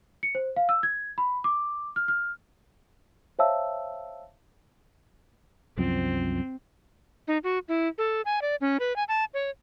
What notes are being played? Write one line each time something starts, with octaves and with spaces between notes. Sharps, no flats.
C#7
C5
F5
E6
G#6
B5
D6
F6
F6
C5 C#5 E5 F5 A5 E6
C2 F#2 F3 C4
D#4
F#4
E4
A4
G#5
D5
C#4
B4
G#5
A5
C#5